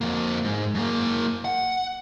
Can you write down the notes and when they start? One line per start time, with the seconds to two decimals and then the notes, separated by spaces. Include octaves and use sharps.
0.01 F2 A#3
0.44 G#2
0.75 F#2 A#3
1.45 F#5